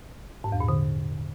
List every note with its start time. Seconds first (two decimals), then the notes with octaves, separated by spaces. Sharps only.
0.44 G#2
0.52 E2
0.60 A#2
0.69 D3